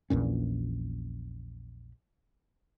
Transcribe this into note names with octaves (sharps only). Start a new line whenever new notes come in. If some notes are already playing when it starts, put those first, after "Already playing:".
A#1 E2 A#2 C#4